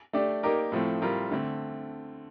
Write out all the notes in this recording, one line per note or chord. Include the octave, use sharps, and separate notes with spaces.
A3 D4 G4 D5
A#3 D#4 G4 A#4 D5
A2 F3 A3 C4
A2 G3 C4 F4 A#4
D3 A3 C4